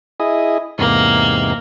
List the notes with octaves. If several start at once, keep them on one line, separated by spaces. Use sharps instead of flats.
E4 G#4 D#5
E2 G#2 C3 A#3